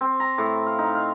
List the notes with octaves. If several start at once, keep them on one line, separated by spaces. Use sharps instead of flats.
C4
A#5
A2
F5
D#4
F5